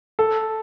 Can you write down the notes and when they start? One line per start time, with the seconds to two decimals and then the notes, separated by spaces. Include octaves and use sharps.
0.19 A4